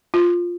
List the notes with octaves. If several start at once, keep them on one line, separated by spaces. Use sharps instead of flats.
F4